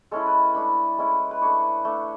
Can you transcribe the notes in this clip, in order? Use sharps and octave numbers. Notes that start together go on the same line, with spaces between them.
G#3 C#4 E4 A4
B4
A5
A3 D4 B5
G#3 C#4 E4
B4
A3 D4 C#5
A3 D4